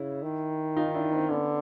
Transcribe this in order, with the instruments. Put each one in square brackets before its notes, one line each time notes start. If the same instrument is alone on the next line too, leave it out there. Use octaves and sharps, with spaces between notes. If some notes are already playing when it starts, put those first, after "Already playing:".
Already playing: [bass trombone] C#3 [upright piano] E4
[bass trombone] D#3
[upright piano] D#4 F4
D4 E4
C4 D4
[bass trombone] D3 [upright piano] B3 C#4